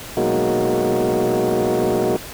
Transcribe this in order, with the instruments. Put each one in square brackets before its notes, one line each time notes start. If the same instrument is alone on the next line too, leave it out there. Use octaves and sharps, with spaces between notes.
[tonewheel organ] B2 F#3 G#3 A#3 D#4 F#4